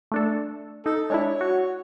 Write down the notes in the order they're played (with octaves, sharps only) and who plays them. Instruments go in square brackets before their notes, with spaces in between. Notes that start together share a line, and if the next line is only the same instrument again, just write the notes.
[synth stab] A3 D4 A4
[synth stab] D#4 [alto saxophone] A4
[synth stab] G#3 D4 E4 [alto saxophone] C#5
[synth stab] F#4